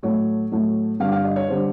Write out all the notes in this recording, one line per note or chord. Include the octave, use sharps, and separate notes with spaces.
A2 F#3 A3 C#5
A2 F#3 A3
G2 D3 G3 F5
F5
D#5
C#5
D3 G3 C5